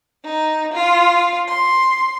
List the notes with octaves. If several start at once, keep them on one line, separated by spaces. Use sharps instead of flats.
D#4
F4
C6